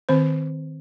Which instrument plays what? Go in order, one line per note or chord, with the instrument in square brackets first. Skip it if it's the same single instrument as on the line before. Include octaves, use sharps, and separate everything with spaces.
[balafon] D#3 C4 C5